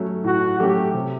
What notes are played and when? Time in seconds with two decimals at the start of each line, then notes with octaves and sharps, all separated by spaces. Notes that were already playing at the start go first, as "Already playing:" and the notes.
Already playing: F#3 A3 C#4
0.24 A2 F#4
0.59 F#3 A3 C#4 G4
0.94 C3